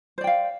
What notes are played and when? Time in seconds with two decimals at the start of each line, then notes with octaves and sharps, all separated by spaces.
0.18 C5
0.21 D5
0.24 G5
0.27 F5